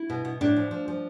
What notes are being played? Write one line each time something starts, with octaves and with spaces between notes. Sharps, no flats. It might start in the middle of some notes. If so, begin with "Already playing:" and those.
Already playing: E4
B2
B2
A2 D4
F3
F3
F3